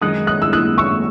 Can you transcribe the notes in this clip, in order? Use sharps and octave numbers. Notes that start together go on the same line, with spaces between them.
F#2 D#3 G#3 D#4 D#6 F#6
D#6 F#6
E6
D#6 F#6
C#6 E6